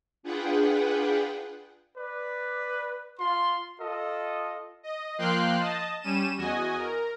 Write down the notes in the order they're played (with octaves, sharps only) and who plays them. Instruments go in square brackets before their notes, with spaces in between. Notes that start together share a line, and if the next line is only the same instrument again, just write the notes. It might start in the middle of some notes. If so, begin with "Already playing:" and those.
[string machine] D4 F4 G#4 B4 F#5 G5
[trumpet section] B4 D5
F4 C6
F4 A4 D#5
[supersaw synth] D#5
F3 A#3 F5 G5 C6 F#6
D#5 A5
G3 C#4 D#7 E7
E2 F#4 D#5 G#5
A#4